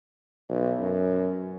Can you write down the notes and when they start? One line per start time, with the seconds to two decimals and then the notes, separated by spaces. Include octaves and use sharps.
0.49 B1
0.80 F#2